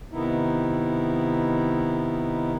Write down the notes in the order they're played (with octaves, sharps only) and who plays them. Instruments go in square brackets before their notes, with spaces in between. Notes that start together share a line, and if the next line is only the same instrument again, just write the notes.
[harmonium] C3 D#3 B3 D#4 E4